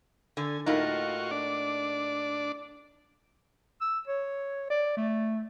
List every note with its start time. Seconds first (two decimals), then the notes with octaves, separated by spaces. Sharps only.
0.37 D3 G#5
0.66 A2 A#3 D#4 F4 F#4 C#6
1.31 D4 D5
3.81 E6
4.07 C#5
4.70 D5
4.97 A3